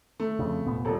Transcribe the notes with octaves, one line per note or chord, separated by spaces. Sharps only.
A3
F2 C#3
F1 A#2 B3
D#1 A4